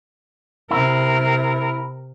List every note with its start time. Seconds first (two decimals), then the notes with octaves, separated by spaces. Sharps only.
0.71 C3 E4 A#4